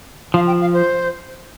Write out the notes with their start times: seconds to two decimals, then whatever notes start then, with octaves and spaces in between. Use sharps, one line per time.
0.34 F3 F5
0.46 G5
0.61 F5
0.73 C5